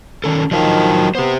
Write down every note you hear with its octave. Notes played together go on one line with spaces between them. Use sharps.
D#3 C#4 A4
D#3 F3 F#3 D#5 F5
B3 G4 C5